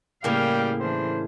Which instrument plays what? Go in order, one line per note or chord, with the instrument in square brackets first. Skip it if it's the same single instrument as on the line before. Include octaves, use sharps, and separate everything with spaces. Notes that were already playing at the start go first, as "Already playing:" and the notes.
[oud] A2 C#3 A#3 [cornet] G3 [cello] F5 G5
[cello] E3 D4 [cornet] C5